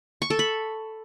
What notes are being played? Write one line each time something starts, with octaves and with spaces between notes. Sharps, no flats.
C#6
A4
B5